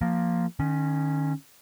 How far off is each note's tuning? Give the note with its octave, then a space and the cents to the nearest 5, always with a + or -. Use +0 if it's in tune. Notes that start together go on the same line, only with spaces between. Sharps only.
F3 +0 A#3 +0
D#3 -30 C#4 -5